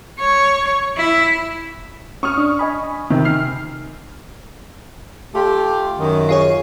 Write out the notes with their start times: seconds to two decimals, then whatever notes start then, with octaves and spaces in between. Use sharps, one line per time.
0.19 C#5
0.97 E4
2.23 C#4 C#6 D#6 F6
2.38 D4
2.59 D#5 G#5 B5
3.10 C3 D#3
3.25 F6 C7
5.35 A3 F4 G4
5.99 F#2 D#3
6.29 F4 G#4 C#5